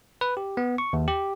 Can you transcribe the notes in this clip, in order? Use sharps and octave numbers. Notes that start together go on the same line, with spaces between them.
B4
G4
B3
C#6
D#2
G4